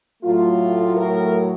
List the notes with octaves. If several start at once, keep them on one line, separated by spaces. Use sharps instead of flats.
A2 F#3 A3 F4
A#4